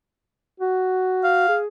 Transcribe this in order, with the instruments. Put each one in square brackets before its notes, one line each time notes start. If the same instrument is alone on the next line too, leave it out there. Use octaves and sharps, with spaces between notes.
[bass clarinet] F#4
[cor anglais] F5
[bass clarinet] G#4